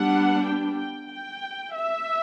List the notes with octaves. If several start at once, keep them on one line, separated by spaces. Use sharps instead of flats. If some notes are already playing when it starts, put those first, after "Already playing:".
Already playing: G3 B3 D4 F#5
G5
G5
G5
E5